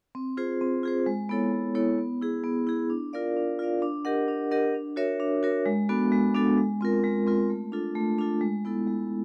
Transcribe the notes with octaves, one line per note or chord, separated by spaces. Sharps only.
C4
F4 G#4 C5
C4
F4 G#4 C5
G#3
B3 E4 A4 C#5
G#3
B3 E4 A4 C#5
B3
E4 G#4
B3
E4 G#4
D4
F4 A#4 D5 F5
D4
F4 A#4 D5 F5
D4
G4 A#4 D#5 F#5
D4
G4 A#4 D#5 F#5
D4
F#4 A#4 C#5 E5
D4
F#4 A#4 C#5 E5
G#3
B3 D4 F#4 A4
G#3
B3 D4 F#4 A4
G#3
C4 F4 A#4
G#3
C4 F4 A#4
A3
D4 F4 A4
A3
D4 F4 A4
G#3
B3 E4 A4
G#3